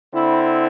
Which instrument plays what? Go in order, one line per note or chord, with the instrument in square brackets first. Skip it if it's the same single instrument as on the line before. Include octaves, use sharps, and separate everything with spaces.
[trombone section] D3 C4 E4